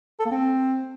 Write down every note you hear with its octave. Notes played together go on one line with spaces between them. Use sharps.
A4
A#3
C4